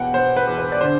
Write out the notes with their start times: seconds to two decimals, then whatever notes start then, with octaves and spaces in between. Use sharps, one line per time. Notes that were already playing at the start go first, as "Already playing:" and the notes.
Already playing: E2 B2 F#5 G5
0.14 B2 C5
0.37 B4
0.47 E2
0.58 B4
0.72 D5
0.81 D3 C5